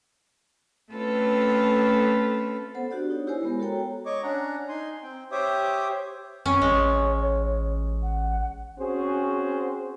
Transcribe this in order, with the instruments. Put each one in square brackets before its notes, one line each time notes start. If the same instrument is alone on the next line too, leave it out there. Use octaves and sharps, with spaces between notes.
[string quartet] A3 C4 C#4 F4 A4 B4
[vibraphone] B3 A4 C5 F#5
D4 F#4 G4 D5
D#4 C#5
E4 G4 A#4 C5 C#5 G#5
G#3 B3 A#4
F#4 A4 C#5 G5 A#5
[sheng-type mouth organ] C#5 D#5 C#6 D6
C#4 D4 F#5 A#5
D#4 G#5 C6
C4 G5
G4 C5 C#5 E5 D6 D#6
[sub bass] F2 [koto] C#4 [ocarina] C#5
[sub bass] A1 [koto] G#3
[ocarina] F#5
[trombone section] C4 C#4 F#4 G#4 C5